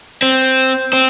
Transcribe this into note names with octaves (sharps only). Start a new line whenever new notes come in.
C4
C4